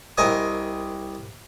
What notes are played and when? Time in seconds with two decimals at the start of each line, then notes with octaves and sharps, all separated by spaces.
0.17 C2 C3 A#4 D#5 G#5 D#6